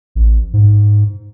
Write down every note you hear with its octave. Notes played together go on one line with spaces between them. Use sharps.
A1
G#2